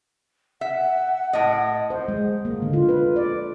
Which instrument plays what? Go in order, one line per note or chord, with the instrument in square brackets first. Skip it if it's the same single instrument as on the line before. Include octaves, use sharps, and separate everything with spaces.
[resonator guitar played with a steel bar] E5 [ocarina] F#5
[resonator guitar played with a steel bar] A2 D#5
[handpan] C5
G#3
A#3
D3
F4
B4
D5